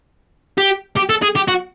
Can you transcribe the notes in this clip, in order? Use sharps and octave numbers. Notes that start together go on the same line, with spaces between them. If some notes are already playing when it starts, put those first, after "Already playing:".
G4
G4
A4
G#4
G4
F#4